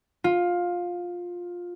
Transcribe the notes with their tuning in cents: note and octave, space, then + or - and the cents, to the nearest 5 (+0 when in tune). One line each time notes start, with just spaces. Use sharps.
F4 +15